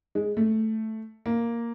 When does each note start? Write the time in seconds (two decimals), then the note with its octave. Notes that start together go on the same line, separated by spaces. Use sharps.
0.15 G#3
0.37 A3
1.26 A#3